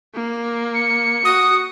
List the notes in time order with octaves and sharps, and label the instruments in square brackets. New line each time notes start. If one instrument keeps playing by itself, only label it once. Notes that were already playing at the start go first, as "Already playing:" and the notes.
[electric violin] A#3
[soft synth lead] C#7
[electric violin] F#4 [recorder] D#6